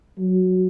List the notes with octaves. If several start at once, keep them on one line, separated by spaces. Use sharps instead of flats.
F#3